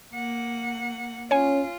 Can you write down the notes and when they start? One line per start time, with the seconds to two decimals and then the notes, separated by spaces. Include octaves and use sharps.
0.13 A#3 F#5
1.31 C#4 F4 C#5 G#5